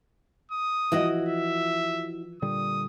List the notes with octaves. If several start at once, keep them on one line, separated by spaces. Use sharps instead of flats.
D#6
E3 F3 E4 F#4 D#5
E5
A#2 D3 G3 D#6